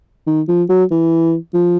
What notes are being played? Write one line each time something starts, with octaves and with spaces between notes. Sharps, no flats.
D#3
F3
F#3
E3
F3